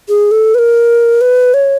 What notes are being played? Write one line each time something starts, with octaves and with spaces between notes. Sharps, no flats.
G#4
A4
B4
A#4
B4
C#5